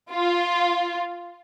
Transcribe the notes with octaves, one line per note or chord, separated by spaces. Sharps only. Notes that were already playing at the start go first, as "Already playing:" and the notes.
F4